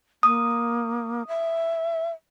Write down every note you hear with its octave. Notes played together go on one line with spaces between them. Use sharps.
A#3 D#6
E5